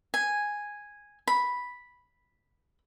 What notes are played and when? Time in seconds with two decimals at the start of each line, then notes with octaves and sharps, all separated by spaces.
0.14 G#5
1.28 B5